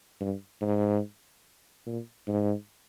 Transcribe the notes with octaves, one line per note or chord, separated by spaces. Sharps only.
G2
G#2
A#2
G#2